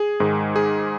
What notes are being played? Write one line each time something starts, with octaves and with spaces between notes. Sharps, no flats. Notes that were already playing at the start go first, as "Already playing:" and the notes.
Already playing: G#4
G#2 D#3 G#3
G#4